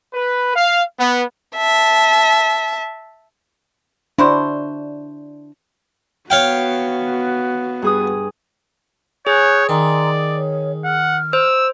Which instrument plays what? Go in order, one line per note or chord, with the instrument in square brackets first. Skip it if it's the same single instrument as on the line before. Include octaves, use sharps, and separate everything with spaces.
[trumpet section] B4
F5
B3
[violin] E5 A5
[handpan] D4 [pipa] E4 F#4 C5
[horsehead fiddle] B3 F#4 [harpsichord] C#5 F5 G5
[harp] G2 G#4 D#6
[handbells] G#4 [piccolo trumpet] C#5 [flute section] G#5 F#6 G6
[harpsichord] D#3 [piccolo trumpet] D5 [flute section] G#5 A#5 C6
[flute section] C#5
[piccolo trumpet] F#5 [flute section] F6
[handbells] C5 [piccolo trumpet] E6